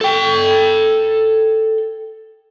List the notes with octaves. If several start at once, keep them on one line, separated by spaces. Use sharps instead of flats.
A4 G5